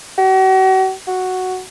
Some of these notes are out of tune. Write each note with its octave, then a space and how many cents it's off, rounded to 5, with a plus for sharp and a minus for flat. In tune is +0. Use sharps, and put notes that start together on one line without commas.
F#4 +40
F#4 +0